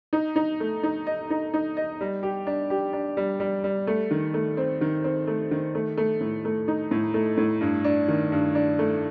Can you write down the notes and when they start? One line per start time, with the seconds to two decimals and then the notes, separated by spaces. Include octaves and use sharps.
0.13 D#4
0.36 D#4
0.60 A3
0.83 D#4
1.07 D#5
1.30 D#4
1.54 D#4
1.77 D#5
2.01 G3
2.23 G4
2.47 D4
2.70 G4
2.93 D4
3.17 G3
3.40 G3
3.64 G3
3.87 A3
4.11 D#3
4.34 A3
4.57 C4
4.81 D#3
5.04 C4
5.27 A3
5.51 D#3
5.75 A3
5.97 A3
6.21 A2
6.45 A3
6.68 D#4
6.91 A2
7.14 A3
7.38 A2
7.61 G2
7.84 D4
8.08 D#3
8.32 G2
8.55 D4
8.79 A3